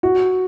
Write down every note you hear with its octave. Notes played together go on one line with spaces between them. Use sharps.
F#4